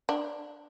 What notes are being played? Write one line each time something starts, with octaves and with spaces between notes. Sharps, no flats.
D4